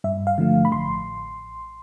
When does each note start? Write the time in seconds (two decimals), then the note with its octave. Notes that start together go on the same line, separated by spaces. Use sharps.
0.04 G2 E5
0.27 F5
0.38 D3 F3 A3
0.65 B5
0.72 A1 C6